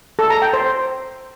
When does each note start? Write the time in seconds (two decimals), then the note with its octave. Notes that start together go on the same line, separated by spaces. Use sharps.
0.19 A4
0.30 A#5
0.42 G5
0.53 C5